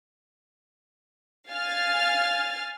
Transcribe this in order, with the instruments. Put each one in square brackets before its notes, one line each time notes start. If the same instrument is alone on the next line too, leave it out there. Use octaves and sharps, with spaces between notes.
[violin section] F5 G#5 F6 A6